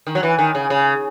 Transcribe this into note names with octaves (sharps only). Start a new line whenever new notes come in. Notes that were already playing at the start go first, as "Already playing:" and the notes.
D#3
F#3
E3
D#3
C#3
C#3